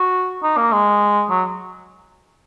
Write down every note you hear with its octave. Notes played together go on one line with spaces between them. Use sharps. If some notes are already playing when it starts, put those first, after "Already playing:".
Already playing: F#4
D#4
A#3
G#3
F#3